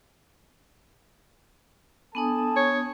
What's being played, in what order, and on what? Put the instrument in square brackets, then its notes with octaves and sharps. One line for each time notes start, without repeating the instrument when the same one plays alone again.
[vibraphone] B3 D4 D#6 [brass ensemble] A4 G#5 A5
[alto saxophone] C#5